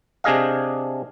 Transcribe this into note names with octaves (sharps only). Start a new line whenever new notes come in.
C3 D4 G#4 D#5 F5